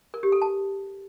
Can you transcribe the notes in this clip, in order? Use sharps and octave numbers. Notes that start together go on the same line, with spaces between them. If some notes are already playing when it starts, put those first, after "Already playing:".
A#4
G4
A4
A5